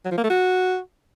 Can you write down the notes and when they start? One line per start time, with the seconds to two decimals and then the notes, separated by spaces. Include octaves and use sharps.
0.05 F#3
0.11 F3
0.17 A#3
0.24 A3
0.30 F#4